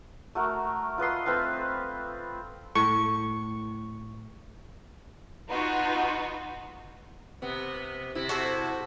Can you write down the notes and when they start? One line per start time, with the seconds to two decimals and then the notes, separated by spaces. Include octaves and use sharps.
0.35 A3 F#4 A#4
0.98 F4 B4 D#5 C6
1.26 C4 A4 B4 F5
2.75 A2 C#6
5.48 B3 D#4 F4 F#4
7.42 C3 B3
8.15 C3 E4
8.29 F#4 A4 C5